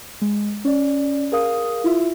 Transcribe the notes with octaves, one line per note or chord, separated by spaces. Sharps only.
G#3
C#4 D5
G#4 A#4 F5 D#6
E4 F4 E5